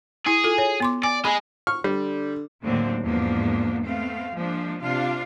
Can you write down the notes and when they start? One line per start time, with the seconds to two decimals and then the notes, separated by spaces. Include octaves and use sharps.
0.27 E4 G#4
0.44 F4 A4
0.58 C#5
0.80 B3 C6 D6
1.03 D5 G#5
1.25 G#3 G#4 B5
1.67 C#6 F6
1.84 D3 G3
2.63 D#2 A2 D3 F#3 C4
3.03 E2 G#2 F3 A#3 B3 D4
3.84 A3 B3 C4 F5
4.35 F3 G#3 A#3 D4
4.81 C3 D4 F4 F5